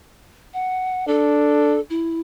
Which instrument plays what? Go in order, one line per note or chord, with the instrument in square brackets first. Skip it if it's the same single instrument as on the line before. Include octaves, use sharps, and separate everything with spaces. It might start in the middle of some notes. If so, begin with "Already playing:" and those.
[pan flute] F#5
[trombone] D4 [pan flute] A4
[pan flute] E4